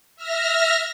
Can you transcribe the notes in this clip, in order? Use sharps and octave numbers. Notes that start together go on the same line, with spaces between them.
E5 F6 A#6